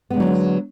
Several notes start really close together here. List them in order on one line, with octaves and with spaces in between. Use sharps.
B3 G#3 D3 F#3